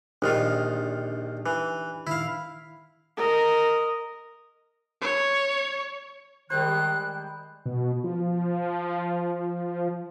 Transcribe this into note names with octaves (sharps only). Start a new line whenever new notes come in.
A#1 D#3 D4 D#4 F4 G4
E3
D#3 E4 F5
A#4 D#5
C#5
D#3 G3 G#3 C5 F#6
B2
F3